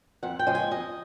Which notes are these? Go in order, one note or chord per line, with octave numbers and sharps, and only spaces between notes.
F2 F#5
G5
C#3 F3 G#3
G#5
F2 D#5